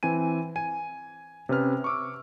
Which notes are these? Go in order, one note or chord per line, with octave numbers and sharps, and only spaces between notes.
E3 C4 G#5 D#7
G#5 D#7
C3 C#4 B4 F6
C#6 D6 E6